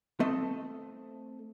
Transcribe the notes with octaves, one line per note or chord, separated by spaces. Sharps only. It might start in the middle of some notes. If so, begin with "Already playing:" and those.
A3 C4 A4 D#5